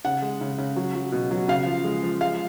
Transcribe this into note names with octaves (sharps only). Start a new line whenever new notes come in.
C#3 F#5
G#3
C#3
C#3
F#3
F#3
B2
F#3
C#3 F5
F3
G#3
F3
G#3 F5